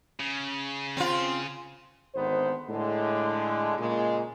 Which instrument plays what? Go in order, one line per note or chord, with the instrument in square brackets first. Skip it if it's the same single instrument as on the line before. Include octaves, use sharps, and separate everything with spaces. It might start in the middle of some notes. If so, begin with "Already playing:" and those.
[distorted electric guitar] C#3
[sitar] C4 F4
[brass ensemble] G#1 D2 D#3 B3 C5
A2 D3 G#3
A#2 C#3 G#3